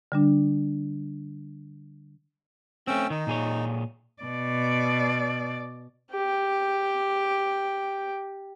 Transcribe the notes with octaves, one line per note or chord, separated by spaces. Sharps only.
D3 G3 D4
A3 C4 C#4 G5 E6
D#3 D#4
A#2 G#4 C#5
B2 D5
G4 G5